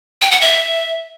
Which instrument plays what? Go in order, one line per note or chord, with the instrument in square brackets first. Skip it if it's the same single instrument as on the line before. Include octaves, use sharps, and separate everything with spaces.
[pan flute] G5
F#5
E5